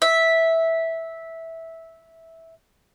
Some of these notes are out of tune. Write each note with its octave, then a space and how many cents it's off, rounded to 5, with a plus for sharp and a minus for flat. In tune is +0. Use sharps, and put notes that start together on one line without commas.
E5 -10